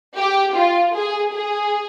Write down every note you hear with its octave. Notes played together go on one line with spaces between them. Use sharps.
G4
F4
G#4
G#4